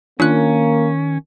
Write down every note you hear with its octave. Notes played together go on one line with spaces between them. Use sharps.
D#3 A#3 C#4 D4 F4 F#6